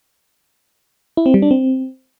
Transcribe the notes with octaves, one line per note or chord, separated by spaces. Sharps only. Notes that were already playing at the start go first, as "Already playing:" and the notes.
E4
C4
G3
D4
C4